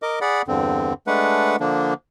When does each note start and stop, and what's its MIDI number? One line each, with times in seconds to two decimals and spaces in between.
0.02 0.19 70
0.02 0.19 75
0.02 0.19 86
0.21 0.42 68
0.21 0.42 74
0.21 0.42 78
0.21 0.42 83
0.48 0.93 40
0.48 0.93 43
0.48 0.93 50
0.48 0.93 60
1.07 1.56 56
1.07 1.56 57
1.07 1.56 62
1.07 1.56 71
1.07 1.56 78
1.60 1.94 50
1.60 1.94 53
1.60 1.94 58
1.60 1.94 62